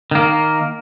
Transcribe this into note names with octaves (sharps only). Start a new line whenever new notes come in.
D#3 A#3